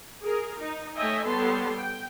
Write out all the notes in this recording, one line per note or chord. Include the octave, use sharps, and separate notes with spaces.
G#4 A#4
D#4
A3 C#5 D#5 E5 G5 G#5
G3 B3 A4 C#5 A5 C6
G5